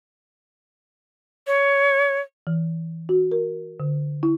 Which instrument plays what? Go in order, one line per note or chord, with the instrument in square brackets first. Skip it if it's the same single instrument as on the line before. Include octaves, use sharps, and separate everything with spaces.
[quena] C#5
[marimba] E3
F#4
A#4
D3
E4